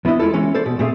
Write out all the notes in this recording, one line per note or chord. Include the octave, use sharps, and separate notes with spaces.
E2 B3 D4 E4 D#5
G#3 E4 F4 A4
E3 G#3 C#4
A4 C5 D5
B2
A#2 A3 C4 G#4 F5